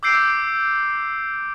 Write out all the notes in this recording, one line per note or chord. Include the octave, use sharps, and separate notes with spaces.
D6 E6 G6 C7 D7